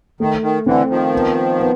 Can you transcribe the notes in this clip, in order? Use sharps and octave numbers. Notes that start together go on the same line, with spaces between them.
D#3 A3
D#3
D3 E3 C4
D#3 F3
B3
B3